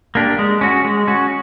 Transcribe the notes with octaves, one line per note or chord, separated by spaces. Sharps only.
A#3 D4 G4
G#3
C#4 F#4
G#3
C#4 F#4